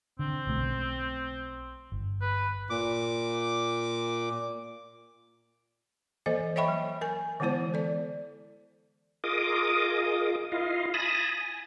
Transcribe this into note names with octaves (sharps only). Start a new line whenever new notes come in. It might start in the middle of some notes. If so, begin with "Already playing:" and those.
D3 C4
B1 B2 A3
G1
B4
A#2 D6
E3 A#3 A4 C5 D#5
C#5 D#5 E5 G5 B5 C#6
F#3
A#4 G#5
D3 E3 G#3 B3 E4 C5
A4 D5
F4 G#4 A#4 D#5 D6 D#6
E4 F4 D#5 F5
G#5 A5 B5 D#6 A#6
G#5